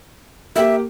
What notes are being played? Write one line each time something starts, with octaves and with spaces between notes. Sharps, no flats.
A#3 G4 E5